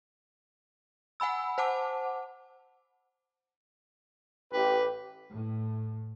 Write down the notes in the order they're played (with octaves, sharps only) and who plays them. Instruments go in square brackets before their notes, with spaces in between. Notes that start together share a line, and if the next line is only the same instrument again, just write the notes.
[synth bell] F#5 G#5 B5 E6
C5 F#5 A5 D6
[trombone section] A1 G4 [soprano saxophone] B4
[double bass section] A2